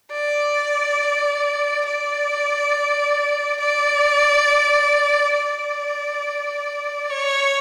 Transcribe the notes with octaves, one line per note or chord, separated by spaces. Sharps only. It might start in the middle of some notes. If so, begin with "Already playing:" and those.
D5
D5
D5
D5
C#5